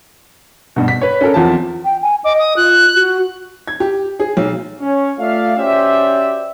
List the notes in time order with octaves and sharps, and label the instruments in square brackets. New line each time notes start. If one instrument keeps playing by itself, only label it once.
[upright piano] G2 B2
B6
B4 C#5
C#4 F#4 A4 A#4
E2 F3 C4 A5
[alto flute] G5
G#5
[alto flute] D#5 [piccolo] D6
[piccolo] D#6
[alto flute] F4 [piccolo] F#6
[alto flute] F#4
[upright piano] G#6
G4
G#4
B1
[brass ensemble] C#4
A3 F4 D5 E5 F5
C#4 F#4 G4 C5 D5 E5